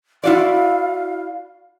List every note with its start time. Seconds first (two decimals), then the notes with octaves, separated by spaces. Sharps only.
0.24 E4 F#4 D5 F5